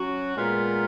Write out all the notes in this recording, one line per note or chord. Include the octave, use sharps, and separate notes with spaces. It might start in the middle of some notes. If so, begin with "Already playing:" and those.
Already playing: F#3 C#4 F#4
A#2 G#3 B3 F4 A#4